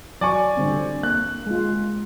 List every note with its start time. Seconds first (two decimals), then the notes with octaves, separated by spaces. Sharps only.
0.21 F#3 D5 G#5 C#6
0.57 D3 G3 C4
1.03 A#3 F#6
1.47 G#3 F4